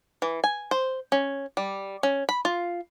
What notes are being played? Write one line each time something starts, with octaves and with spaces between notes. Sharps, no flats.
E3
G#5
C5
C#4
G3
C#4
B5
F4